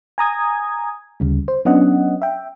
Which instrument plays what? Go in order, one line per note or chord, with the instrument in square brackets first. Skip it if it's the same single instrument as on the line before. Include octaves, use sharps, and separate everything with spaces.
[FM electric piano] G#5 A#5 D#6 G#6
D2 C#3 G3
C5
F#3 B3 C#4 D4 D#5 F#5
E5 G5